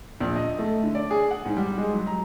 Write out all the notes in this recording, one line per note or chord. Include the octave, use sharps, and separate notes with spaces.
A#1
D#5
A3
D3
D5
G#4
F#5
G#2
G3
G#3
F#3
A#5